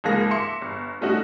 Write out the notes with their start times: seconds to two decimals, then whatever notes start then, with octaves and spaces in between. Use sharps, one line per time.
0.04 C#2 G#2 F3 G#3 A#3 A#6
0.31 E5 C6 D6 C#7
0.62 G1
1.01 G3 A3 C#4 D#4 F#4